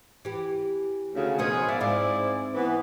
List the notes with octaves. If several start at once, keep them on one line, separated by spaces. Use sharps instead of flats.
E3 G4
D2 C#3
B2 D#3 F3 B3 C#4 G#4
B3 D5 E5 F5
G#2 C4 E4 G#4 D5 F5
E3 B3